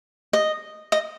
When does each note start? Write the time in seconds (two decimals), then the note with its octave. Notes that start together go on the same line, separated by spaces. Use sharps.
0.33 D#5
0.92 D#5